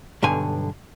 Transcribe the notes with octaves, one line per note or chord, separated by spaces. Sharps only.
B1 G2 D3 G#5